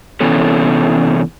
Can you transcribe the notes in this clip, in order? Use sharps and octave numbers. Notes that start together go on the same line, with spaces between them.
C3 E3 B3 C#4 A4